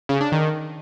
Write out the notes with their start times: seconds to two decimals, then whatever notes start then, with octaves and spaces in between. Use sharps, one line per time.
0.09 C#3
0.21 D4
0.32 D#3